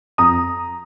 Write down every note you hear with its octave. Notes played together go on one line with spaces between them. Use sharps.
F2 A#5 D#6